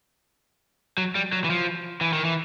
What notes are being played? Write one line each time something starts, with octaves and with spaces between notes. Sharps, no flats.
F#3
G3
F#3
E3
F3
E3
D#3
E3